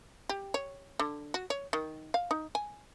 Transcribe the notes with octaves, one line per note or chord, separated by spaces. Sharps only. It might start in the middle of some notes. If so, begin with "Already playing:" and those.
G4
C#5
D3
F#4
C#5
D#3
F5
D#4
G#5